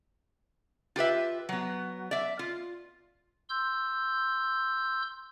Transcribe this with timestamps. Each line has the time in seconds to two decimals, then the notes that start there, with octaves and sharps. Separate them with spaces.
0.96 F4 G4 B4 E5
1.49 F#3 B3
2.11 D5 E5
2.39 F4
3.50 C6 E6 G6